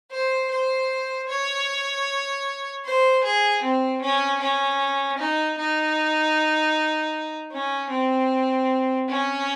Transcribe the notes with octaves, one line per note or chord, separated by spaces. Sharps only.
C5
C5
C#5
C5
G#4
C4
C#4
C#4
D#4
D#4
C#4
C4
C#4